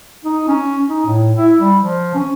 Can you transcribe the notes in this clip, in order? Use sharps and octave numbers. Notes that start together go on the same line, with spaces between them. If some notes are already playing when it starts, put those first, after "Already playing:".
D#4
C#4
D#4
A2
E4
G3
F3
C#4